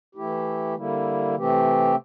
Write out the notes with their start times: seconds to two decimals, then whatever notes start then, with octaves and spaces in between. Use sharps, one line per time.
0.15 E3 A3 E4 G4
0.75 D3 G3 A#3 E4
1.36 C3 E3 A3 C4 G4